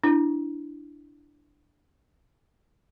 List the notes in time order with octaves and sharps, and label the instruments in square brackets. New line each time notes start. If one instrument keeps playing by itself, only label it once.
[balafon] D4 E4